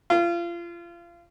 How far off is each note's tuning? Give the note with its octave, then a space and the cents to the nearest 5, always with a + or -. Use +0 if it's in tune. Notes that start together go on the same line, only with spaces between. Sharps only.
F4 -30